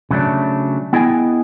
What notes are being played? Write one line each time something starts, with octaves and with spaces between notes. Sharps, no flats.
C#3 F#3 A3 D4
B3 E4 G#4 D#5 G5 G#5